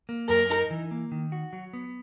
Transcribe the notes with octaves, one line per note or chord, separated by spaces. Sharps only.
A#3
F#2 A#4
D#4
E3
A#3
D#3
F#4
F#3
B3